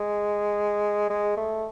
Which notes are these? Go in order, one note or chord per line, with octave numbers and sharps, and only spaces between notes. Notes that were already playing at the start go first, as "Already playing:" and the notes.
Already playing: G#3
G#3
A3